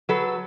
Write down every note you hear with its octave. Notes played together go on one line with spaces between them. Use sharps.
F#3 A4 B4